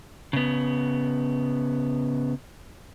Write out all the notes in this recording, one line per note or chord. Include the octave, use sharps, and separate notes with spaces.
C#3 B3